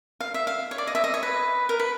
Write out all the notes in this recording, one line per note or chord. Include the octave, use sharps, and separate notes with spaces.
F5
E5
F5
C#5
D5
D#5
E5
D#5
C#5
B4
A#4
B4